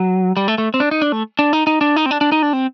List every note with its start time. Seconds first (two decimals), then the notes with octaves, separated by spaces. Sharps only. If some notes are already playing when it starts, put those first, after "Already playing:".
Already playing: F#3
0.37 G3
0.48 A3
0.58 A3
0.74 C4
0.80 D4
0.91 D#4
1.02 D4
1.12 A3
1.39 D4
1.53 D#4
1.67 D#4
1.81 D4
1.96 D#4
2.06 C4
2.11 D4
2.21 D4
2.32 D#4
2.42 D4
2.53 C4